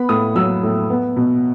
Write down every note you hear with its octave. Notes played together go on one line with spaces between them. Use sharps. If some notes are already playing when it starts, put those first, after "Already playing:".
Already playing: B3 B5
A2 D#6
F#3 E6
A2
B3
B2